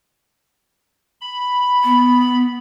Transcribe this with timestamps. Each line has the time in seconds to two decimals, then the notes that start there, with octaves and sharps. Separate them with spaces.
1.21 B5
1.84 B3